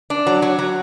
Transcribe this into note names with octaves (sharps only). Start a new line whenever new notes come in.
D4
F#3
F#3
F#3